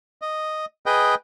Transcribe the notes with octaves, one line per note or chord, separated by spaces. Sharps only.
D#5
G#4 B4 D#5 G5